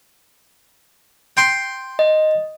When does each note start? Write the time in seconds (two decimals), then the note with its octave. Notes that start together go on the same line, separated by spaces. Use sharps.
1.37 G5 C6
1.99 D#5